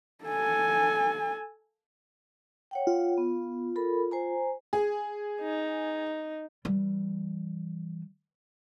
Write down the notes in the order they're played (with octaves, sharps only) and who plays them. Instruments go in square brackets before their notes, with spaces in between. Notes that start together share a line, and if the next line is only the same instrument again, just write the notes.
[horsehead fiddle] A4 G#5
[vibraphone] C#5 F#5 G5
[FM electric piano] F4
[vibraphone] B3
A4 A#4 B5
C5 G#5 A#5
[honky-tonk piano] G#4
[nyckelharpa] D#4
[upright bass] E3 G3